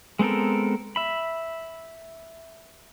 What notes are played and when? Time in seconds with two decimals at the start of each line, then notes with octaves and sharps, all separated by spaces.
0.19 G#3 B3 C4 A4 A#4
0.96 E5 B5